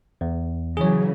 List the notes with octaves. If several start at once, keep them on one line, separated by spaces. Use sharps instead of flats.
E2
C#3 E3 F#3 G#4 C#5